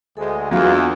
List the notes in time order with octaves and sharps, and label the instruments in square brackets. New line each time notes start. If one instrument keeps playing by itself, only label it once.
[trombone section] D2 G#3 [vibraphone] A4
[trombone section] E2 [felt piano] F#3 F4 [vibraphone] D4